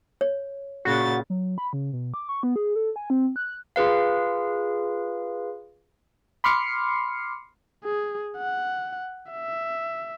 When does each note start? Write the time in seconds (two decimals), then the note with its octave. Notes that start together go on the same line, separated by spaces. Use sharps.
0.21 C#5
0.85 A#2 C#3 F#4 A6
1.30 F#3
1.58 B5
1.73 C#3
1.93 B2
2.14 D6
2.29 C#6
2.43 B3
2.56 G#4
2.76 A4
2.96 G#5
3.10 C4
3.36 F#6
3.76 F4 G#4 B4 F5
6.44 B5 C6 D6 F6 C7 C#7
7.84 G#4
8.37 F#5
9.32 E5